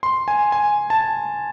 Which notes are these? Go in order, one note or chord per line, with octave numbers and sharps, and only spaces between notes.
C6
G#5
G#5
A5